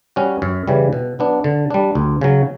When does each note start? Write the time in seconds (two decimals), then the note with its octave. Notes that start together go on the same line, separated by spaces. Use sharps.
0.16 G3 C#4 F#4
0.42 F#2
0.67 C#3 E3 G3
0.93 B2
1.19 F#3 B3 D4
1.44 D3
1.70 G3 D4
1.95 D2
2.21 C#3 F#3